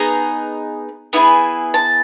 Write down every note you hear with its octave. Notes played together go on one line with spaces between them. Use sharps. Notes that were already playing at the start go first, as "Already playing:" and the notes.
Already playing: B3 D#4 G#4 A#5
B3 E4 G#4
A5